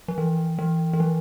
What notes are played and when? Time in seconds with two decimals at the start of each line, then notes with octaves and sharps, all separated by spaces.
0.08 F3
0.18 E3
0.59 E3
0.93 E3
1.00 F3